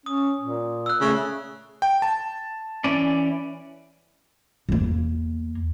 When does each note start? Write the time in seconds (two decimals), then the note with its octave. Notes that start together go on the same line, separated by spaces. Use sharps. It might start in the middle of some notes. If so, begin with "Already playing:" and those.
0.06 C#4 D#6
0.40 A#2
0.86 E6 F#6
1.01 C#3 A3
1.82 G5
2.02 A5
2.84 E3 C#4 D5
4.69 E2 A#3